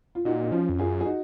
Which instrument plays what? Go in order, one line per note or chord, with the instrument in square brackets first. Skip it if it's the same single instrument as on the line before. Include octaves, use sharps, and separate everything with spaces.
[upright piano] F4
[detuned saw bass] A#2 [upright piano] D#4 F#4
[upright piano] D#4
[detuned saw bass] F3 [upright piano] C#4 F4
[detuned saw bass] F2
[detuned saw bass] F#2 [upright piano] F4 G#4
[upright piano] G#4
D#4 F#4